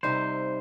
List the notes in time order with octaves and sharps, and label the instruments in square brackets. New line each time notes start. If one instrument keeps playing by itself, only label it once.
[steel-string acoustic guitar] C3 G3 C4 D#4 [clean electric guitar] C5